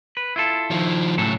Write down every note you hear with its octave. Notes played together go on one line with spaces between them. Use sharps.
B4
E4 F4 A4
D#3 F3
A2 C#3 F#3 A4